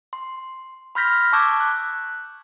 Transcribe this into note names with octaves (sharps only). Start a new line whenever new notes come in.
C6
B5 C6 F6 G6 A#6 B6
A5 C#6 D6 E6 G6 G#6
F#6